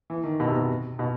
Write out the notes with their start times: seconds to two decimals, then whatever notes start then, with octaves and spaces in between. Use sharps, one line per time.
0.10 E3
0.24 D#3
0.40 B2
0.47 C3
0.56 B2
0.99 B2